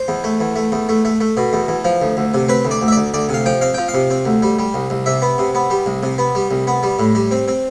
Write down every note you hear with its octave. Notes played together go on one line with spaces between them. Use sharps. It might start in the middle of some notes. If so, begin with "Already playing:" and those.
Already playing: C5
E2
A3
E2
A3
E2
A3
A3
A3
B2
E2
E2
F3
D2
D2
C3
C4 B4
D2
D5
D2
E5
D2 D5
D2 D5
C3
F5
F3 G5
C4 F5
F3 G5
F5
C3
C4
D2
G3
G3
C2
C2
C3 E5
B3
C3
B3
G3
C2
C3
B3
G3
C2
B3
G3
A2
G3
C4
C4